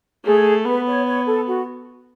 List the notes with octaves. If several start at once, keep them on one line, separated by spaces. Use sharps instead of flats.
A3 G#4
B3 B4
C#5
C#5
A4
F#4